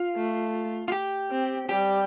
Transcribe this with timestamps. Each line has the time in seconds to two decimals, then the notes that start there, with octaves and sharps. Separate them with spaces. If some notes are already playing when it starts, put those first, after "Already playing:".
Already playing: F4
0.16 A3
0.88 F4
0.92 G4
1.30 C4
1.69 G3 G4